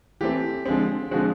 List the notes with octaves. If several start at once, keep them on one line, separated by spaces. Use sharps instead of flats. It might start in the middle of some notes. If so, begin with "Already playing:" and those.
E3 A3 C4 G4
D3 F3 G#3 C4
D3 F3 G#3 C4 F#4 G#4